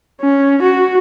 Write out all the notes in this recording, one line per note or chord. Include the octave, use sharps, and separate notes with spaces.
C#4
F#4